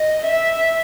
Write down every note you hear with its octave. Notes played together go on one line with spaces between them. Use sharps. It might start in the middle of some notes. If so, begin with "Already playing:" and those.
Already playing: D#5
E5